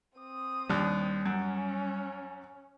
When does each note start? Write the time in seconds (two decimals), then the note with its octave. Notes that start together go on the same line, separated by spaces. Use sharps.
0.18 C4 D#6
0.69 D#2 G3 D4
1.26 F#2 C#4